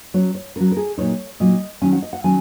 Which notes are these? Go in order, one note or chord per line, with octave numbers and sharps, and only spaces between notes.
F#3 C#4 C#5
C#5
F#3 C#4 A#4
A#4
G#4
A#2 F#3 D#4 C#5
A#2 F#3 D#4 D#5
D#3 F#3 C#4 G#5
F#5
D#5
F#5
D#3 F#3 C#4 G#5